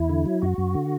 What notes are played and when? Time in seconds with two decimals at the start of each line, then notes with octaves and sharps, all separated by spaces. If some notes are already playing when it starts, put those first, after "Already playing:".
Already playing: E2 E4
0.10 D3
0.26 F#3
0.42 F#2 F#4
0.58 F#2
0.75 D3